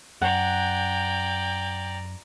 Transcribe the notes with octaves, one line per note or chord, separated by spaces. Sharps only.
F#2 D5 F#5 G5 A#5